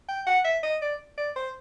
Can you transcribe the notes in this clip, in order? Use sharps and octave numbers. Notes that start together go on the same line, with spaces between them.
G5
F#5
E5
D#5
D5
D5
C5